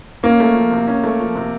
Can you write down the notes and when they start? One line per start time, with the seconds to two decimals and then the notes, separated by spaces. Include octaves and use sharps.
0.23 A#3 C#4
0.40 A3
0.55 F3
0.71 C3
0.87 C#4
1.03 A3
1.20 F3
1.35 C3